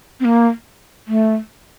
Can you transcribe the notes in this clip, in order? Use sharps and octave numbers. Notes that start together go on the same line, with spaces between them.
C4
A#3
A3